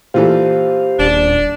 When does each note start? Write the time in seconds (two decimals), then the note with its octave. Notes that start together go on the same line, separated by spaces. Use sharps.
0.14 A#2 E3 A3 G4 C5 F5
0.99 D#1 D4